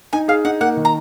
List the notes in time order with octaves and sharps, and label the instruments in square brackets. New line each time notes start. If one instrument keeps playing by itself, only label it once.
[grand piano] D#4 [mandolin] G#5
[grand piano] G#4 [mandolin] F5
[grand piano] D#4 [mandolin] F#5
[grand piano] A#3 [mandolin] F#5
[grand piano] D#3
[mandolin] A#5